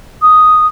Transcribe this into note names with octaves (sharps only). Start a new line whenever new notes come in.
D#6